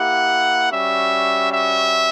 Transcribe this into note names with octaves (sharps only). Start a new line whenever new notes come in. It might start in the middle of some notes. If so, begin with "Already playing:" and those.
Already playing: A#3 E4 G4 F#5
G3 C#4 F#4 E5
E5